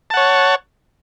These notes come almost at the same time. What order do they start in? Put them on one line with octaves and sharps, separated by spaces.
A5 F#5 C#5